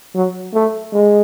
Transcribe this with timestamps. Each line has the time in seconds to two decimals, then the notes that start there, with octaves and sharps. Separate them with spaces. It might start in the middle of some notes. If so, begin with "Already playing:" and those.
0.15 F#3
0.54 A3
0.93 G#3